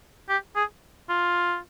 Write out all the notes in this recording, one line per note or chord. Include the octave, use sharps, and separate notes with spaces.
G4
G#4
F4